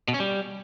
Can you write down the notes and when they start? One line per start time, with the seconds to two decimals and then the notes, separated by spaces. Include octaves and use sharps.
0.08 B2
0.14 C#4
0.20 G3